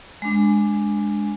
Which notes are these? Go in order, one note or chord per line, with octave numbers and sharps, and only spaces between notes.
G#3 D4